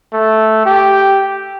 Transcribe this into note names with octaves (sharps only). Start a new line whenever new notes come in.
A3
G4